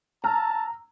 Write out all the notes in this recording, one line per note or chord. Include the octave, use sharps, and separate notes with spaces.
A5 A#5 E6 F6